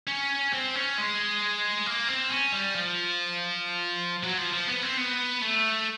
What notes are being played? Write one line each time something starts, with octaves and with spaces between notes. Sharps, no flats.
C#4
C4
C#4
G#3
A#3
C4
C#4
G3
F3
F#3
F3
F3
B3
C4
B3
A3